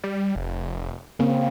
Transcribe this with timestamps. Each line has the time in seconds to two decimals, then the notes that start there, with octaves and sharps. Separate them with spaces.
0.04 G3
0.35 F1
1.19 C#3 A#3 C4